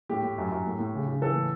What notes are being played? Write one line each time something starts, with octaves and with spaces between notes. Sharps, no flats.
A2 G4
A2
F#2
F#2
A2
A2
C#3
C#3
E3 A4
A2